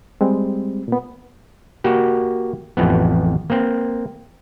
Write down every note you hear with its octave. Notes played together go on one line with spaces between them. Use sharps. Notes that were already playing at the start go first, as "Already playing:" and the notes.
G3 G#3 C4
A#2 B3
A#3 F#4 G4
A1 F2 E3 B3
A#3 C4